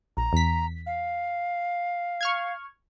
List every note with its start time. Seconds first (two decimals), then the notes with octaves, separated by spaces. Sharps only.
0.17 A#1 A#5
0.33 E2 B6
0.86 F5
2.21 C#6 F6 G#6